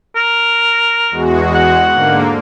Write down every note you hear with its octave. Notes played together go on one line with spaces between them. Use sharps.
A#4
E2 G#3 F#4
F#5
G#2 D3 A#3